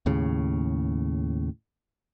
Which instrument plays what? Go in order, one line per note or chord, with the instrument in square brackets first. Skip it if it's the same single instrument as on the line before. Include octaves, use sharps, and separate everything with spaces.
[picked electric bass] D#2 A2 C#3